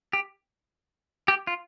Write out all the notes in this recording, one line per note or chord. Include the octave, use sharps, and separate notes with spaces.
G4
G4
F4